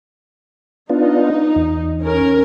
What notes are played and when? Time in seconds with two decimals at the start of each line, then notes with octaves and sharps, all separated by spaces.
0.90 B3 D4 D#4 F4
1.56 E2
2.03 C#4 A#4